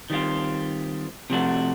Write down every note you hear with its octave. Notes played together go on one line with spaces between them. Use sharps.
D#3 G3 C4 F4
C3 F3 A3 D4 F#4